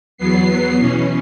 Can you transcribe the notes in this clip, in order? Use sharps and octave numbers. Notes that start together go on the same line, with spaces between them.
E2 F#3 B3 C7
B2 E3 C#4